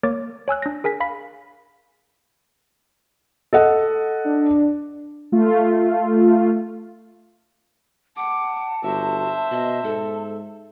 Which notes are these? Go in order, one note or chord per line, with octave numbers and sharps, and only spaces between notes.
A#3 A#4 C#5 D6 A6
C#5 G#5 E6 F#6
D4 A#6
G#4 A#4 G#5 B6
F5 B5 B6
A4 D#5 F#5
D4
A3 F4
F#5 A5 D6
G1 F#4 C5 E5
B2 D#5
G#2 A4